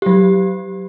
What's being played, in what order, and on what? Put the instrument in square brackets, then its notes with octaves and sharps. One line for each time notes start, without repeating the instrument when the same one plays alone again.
[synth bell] F#3 G4